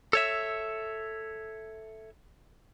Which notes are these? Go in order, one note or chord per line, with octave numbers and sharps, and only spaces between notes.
A4 C#5 E5